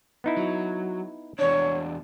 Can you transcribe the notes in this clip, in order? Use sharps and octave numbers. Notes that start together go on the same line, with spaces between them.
B3 D#4 E4
F#3
E2 D4 C#5